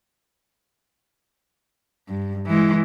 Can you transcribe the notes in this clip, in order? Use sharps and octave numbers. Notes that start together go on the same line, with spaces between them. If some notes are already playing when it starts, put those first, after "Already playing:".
G2
E3 G#3